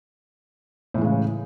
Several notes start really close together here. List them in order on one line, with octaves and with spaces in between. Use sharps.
A2 E3 G#3 C#3